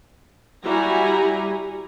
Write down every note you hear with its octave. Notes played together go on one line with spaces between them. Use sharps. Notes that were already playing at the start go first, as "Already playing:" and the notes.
G3 E4 F#4 G#5 A#5